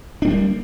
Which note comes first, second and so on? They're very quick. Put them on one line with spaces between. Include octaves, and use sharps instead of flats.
D4 A3 G3 A#3